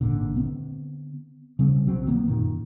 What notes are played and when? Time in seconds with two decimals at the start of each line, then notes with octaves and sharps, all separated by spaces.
0.01 G#1 A#2 D3
0.35 D3 B3 C4
1.59 C#3 G3 C4
1.86 B1 F#3 C4
2.07 D#3 A#3 B3
2.28 F#2 A#2 D#3